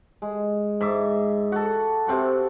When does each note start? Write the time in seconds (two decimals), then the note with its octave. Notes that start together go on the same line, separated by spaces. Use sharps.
0.22 G#3
0.81 G#2 E5 D6
1.52 F#4 A4
2.07 C3 C4 F#4 C#6